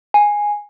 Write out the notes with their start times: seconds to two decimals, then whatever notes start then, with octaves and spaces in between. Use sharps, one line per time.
0.14 G#5